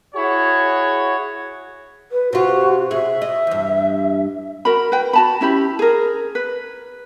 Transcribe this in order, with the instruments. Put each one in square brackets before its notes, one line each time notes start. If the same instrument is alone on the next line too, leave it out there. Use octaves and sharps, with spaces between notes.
[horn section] E4 F#4 G#4 C#5
[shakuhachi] B4
[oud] C3 F4 [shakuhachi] F#4
[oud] C3 G#4 [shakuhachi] E5
[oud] D#5
E2 G2
[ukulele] F#4 A#4 B5
B4 G5
F#4 A5 B5
C#4 E4 G4 B5
G#4 A#4
B4